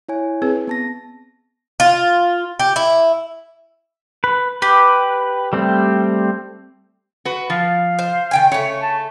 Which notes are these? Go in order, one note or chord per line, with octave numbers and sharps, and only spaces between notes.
E4 C#5 G#5
C4 G#4 B4
B3 A5 A#6
F4
G4
E4
B4
G4 B4
G3 A3 C4
F#4 B4
F3 F5
C5
D#3 G5 G#5
C#3 A3 C#5
A5